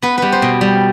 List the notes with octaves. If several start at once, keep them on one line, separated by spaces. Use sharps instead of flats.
B3 B4
G3 B4
C5
B2
G3